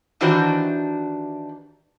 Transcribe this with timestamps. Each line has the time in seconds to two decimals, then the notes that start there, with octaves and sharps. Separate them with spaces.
0.21 D#3 E3 D4 F#4 G4 C5